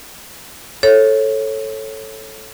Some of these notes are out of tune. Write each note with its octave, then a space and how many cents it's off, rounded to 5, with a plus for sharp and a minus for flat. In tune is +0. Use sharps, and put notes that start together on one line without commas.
A4 +0 C#5 -20